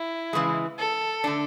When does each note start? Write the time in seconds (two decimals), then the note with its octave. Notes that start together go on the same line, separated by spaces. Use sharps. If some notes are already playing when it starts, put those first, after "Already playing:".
Already playing: E4
0.33 C#3 E3 G#3
0.79 A4
1.24 D3 A3 D4